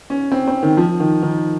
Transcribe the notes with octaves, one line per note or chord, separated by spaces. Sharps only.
C#4
C4
C4
D#3
F3
D#3
D#3